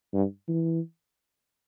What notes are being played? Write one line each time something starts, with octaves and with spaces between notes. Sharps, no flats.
G2
E3